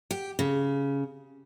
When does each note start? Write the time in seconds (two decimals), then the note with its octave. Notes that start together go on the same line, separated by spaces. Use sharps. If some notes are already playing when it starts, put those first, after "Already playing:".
0.11 G4
0.39 C#3